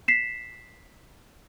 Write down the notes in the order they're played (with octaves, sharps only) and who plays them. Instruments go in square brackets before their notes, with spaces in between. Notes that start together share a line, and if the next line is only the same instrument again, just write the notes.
[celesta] B6 C7 E7